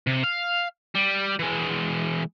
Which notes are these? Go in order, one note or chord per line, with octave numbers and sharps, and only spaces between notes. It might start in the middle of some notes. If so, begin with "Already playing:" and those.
C3
F5
G3
E3 G#3